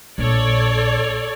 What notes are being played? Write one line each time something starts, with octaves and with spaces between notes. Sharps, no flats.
A#1 A4 C#5 D5